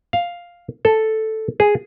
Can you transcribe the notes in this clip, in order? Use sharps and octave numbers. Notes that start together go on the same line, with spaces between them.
F5
A4
G#4